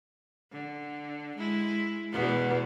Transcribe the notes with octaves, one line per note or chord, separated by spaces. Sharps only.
D3
G#3 E4
E2 B2 B3